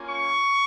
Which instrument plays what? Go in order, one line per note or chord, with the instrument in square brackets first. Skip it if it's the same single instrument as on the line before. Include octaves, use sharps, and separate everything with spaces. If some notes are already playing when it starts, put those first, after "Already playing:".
Already playing: [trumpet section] A#3 C#4 F4
C#6